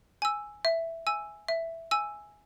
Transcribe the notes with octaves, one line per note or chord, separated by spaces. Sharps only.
G#5 E6
E5
G#5 E6
E5
G#5 E6